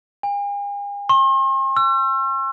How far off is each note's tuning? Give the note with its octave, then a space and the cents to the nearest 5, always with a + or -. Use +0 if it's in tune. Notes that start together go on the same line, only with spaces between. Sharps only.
G#5 -45
C6 +45
E6 +40